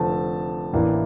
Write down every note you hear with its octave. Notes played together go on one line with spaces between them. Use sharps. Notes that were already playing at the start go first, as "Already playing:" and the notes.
Already playing: F1 F2 D3 F3 A3 A5
A1 A2 E3 A#3 D4